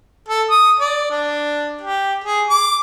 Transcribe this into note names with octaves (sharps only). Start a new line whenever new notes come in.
A4
D#6
D5
D4
G4
G#4
D6